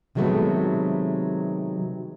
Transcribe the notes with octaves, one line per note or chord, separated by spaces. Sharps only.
C3 D#3 F#3 G#3 A3 B3